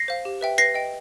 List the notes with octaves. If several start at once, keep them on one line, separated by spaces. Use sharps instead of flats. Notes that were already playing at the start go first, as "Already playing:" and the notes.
Already playing: A#6 C7
C5 F5
G4
B4 E5 G5
B4 A#6 C7
D#5 G5